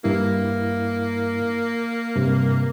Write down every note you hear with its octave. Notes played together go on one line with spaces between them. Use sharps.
G2 A#3 E4
G2 C3